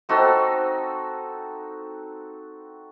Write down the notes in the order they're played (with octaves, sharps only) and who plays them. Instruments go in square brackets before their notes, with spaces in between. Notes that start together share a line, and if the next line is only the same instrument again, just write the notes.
[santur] C4 D#4 F#4 A4